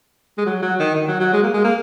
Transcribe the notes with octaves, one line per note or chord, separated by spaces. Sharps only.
G#3
F#3
F#3
D#3
D#3
F#3
F#3
G#3
A#3
G#3
A#3